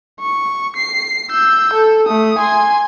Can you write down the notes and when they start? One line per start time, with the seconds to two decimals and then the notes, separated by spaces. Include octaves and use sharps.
0.20 C#6
0.76 C7
1.30 E6 G6
1.73 A4
2.06 A3 D#6
2.39 G#5 C6